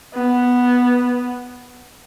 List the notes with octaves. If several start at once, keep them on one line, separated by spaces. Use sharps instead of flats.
B3